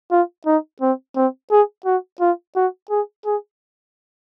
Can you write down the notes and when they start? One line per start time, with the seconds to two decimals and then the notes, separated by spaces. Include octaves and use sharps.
0.11 F4
0.46 D#4
0.81 C4
1.16 C4
1.51 G#4
1.85 F#4
2.20 F4
2.56 F#4
2.90 G#4
3.25 G#4